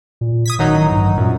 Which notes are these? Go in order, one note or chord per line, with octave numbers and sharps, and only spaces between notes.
A#2
D#6 G#6 B6
A1 D#3 F#3 D#4
G2
F#2 A#2